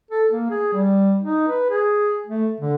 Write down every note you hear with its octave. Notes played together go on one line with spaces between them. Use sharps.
A4
A#3
G#4
G3
D#4
B4
G#4
A3
D3